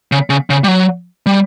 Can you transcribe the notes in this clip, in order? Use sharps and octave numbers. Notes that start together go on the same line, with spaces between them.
C#3
C#3
C#3
G3
F#3
G3